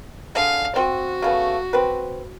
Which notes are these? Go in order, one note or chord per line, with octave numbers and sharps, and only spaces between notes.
D3 G#4 F5
C4 F#4
C#3 A3 B3
C4 B4